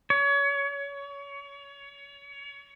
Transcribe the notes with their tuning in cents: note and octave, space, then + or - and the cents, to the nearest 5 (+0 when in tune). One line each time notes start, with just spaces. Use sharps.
C#5 +30